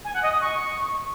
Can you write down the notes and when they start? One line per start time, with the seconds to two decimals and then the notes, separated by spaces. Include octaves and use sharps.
0.04 G#5
0.14 F#5
0.23 D#5
0.32 D#6
0.41 C#6